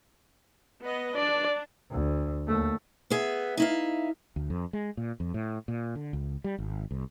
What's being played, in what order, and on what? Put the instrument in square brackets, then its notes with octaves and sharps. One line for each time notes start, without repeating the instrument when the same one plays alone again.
[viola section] B3 B4 D#5
[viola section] D4 [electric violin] D5
[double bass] D2
D#2 A3
[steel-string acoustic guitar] B3 G#4 E5
D#4 E4 F5
[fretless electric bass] D2
F2
G#3
A#2
F2
A2
A#2
D3
C#2
G3
G#1
C2